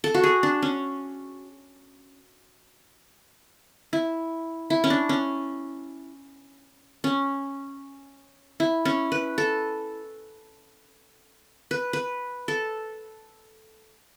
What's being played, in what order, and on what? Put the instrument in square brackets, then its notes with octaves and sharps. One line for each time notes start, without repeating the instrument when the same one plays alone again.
[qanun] A4
F#4
G#4
D4
C#4
E4
E4
C#4
D4
C#4
C#4
E4
C#4
B4
A4
B4
B4
A4